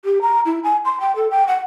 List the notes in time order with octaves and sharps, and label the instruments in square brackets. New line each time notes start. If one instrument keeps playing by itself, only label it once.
[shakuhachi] G4
A#5
E4
G#5
C6
G5
A4
G5
F#5